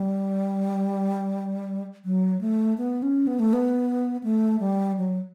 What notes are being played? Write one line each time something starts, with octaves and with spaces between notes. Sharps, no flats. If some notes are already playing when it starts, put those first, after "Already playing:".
Already playing: G3
F#3
A3
B3
C#4
B3
A3
B3
A3
G3
F#3